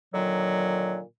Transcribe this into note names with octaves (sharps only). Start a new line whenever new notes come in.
A#2 D3 D#3 F#3